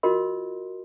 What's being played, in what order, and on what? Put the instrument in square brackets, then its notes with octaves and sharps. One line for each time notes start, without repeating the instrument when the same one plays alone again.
[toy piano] F4 F#4 A#4 D#5 C6